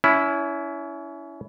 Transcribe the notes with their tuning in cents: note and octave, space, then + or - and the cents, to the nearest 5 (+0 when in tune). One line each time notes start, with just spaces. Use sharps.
C#4 +30 E4 +0